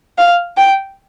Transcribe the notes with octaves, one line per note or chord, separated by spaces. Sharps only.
F5
G5